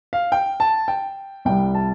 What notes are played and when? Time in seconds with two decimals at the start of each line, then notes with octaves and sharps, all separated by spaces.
0.13 F5
0.32 G5
0.60 A5
0.88 G5
1.45 C2 C3 G3 G5
1.75 A5